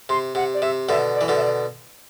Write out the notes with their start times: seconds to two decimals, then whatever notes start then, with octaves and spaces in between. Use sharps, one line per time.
0.09 C3 C6
0.35 C3 F#5
0.54 D5
0.62 C3 E5
0.89 B2 D3 E5
1.15 D5
1.21 E3
1.28 B2 D3
1.36 E5
1.41 D5